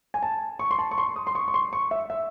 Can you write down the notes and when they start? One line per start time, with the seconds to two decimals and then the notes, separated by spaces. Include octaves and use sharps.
0.14 G#5
0.23 A5
0.59 C#6
0.71 C6
0.79 A5
0.91 C#6
0.98 C6
1.16 D#6
1.27 C6
1.35 C#6
1.48 C#6
1.54 C6
1.73 C#6
1.91 E5
2.10 E5